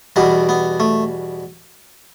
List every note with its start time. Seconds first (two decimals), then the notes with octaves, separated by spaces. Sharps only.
0.16 E2 B2 G3 B3
0.49 B3
0.80 A3